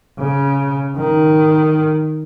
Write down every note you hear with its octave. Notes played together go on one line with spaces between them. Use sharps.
C#3
D#3